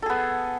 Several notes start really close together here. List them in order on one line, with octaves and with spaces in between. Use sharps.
A4 G#4 B3